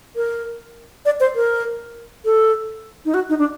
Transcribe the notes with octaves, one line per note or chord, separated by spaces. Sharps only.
A#4
D5
C5
A#4
A4
D#4
F#4
D#4
D4